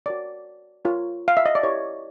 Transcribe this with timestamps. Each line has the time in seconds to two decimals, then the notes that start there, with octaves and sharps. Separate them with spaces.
0.06 F#4 A#4 C#5 D5
0.85 F4 A#4 C#5
1.28 F5
1.37 E5
1.46 D#5
1.55 D5
1.63 E4 G4 A#4 C#5